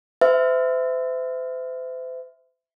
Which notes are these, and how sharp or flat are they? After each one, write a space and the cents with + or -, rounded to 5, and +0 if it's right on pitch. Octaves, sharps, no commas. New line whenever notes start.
C5 -40 E5 +0